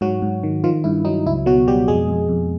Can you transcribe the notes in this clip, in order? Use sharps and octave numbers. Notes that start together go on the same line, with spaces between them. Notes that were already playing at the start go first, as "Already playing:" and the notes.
G#2 F#3 F#4
G#2
D#3
D#3 F3 F4
G2 E4
F#3 D#4
C#2 E4
B2 F#3 F#4
B2 G3 G4
F2 G#3 G#4
F2
F2